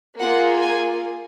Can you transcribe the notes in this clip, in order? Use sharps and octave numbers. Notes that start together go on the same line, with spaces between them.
A#3 F4 G#4 F#5
G#5